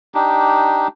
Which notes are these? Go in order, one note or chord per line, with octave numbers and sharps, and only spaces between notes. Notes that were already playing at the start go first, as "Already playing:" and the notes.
D4 D#4 G4